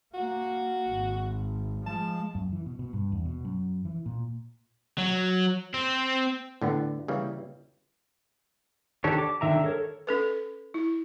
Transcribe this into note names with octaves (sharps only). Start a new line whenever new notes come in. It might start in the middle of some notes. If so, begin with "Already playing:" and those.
A#3 F#4
G#1
F3 G#3 A5
F#2
E3
B2
B2
G2
E2
B2
F#2
E3
A#2
F#3
C4
A2 D3 B3
C#3 E3 G3 A#3
D#3 D4 G4 A4 C#5
D6
D3 D#3 E5 A#5
A4 A#4 C#5
C#4 A4 B4
E4